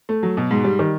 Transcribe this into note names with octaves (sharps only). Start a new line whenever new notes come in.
A3
F#3
B2
G#2
G3
D#3